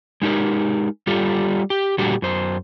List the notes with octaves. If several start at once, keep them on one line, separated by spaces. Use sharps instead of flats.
G#3 D#4 G4 A#4
G3 F4 G4 A4
G4
A#2 D3 G3 F#4 G4
F#2 C5